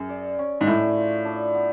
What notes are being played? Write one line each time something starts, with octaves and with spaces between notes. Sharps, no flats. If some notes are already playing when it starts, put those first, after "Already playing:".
Already playing: F#2 G#4
D5
C#4
G#2
A2 D4
F4
D4
B3